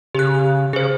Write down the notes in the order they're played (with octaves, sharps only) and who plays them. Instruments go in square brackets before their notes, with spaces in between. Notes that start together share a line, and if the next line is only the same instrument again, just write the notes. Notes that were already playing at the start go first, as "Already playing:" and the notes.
[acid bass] C#3 [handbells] G4 F#6
[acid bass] C#3 [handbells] G#4 C5